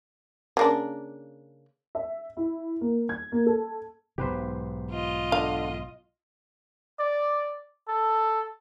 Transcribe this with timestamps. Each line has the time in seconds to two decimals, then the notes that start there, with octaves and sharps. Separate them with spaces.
0.57 C#3 A#3 D4
1.95 E5
2.37 E4
2.81 A#3
3.09 G#6
3.32 A#3
3.46 A4
4.18 B1 G#2 B2 G4 B4 C5
4.91 F4 D#5
5.32 D3 F5
6.99 D5
7.88 A4